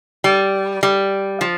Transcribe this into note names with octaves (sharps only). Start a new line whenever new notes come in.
G3
G3
F3